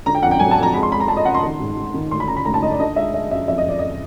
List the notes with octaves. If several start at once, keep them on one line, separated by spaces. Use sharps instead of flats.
D3 A#5
G5
F2 F#5
G5
F#3 G#5
A5
F2 A#5
G#3 B5
C6
G#3 B5
A#5
G#3 A5
D#5
C#3 F#5
C6
D#3
G#2
G#2
D#3
D2 C6
B5
C#3 A#5
B5
D2 A#5
A5
D2 D#5
D5
D3 D#5
G#3 E5
G#3 E5
F#2 E5
F2 E5
D#5
F2 D5
D#5